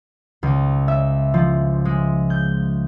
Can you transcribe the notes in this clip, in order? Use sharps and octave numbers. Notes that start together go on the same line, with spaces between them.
C#2
E5
F3
G#3
G6